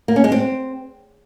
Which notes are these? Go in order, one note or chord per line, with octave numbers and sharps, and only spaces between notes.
A#3
C#4
G#3
C4